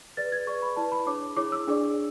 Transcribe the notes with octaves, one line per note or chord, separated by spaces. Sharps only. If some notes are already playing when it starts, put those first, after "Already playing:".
G#4 B4 D5 A6
G#6
G#4 B4 D5 C#6
B5
E4 B4 D5 A5
B5
D4 G#4 C#5 D6
E4 G#4 C#5 D6
E6
D4 G#4 D5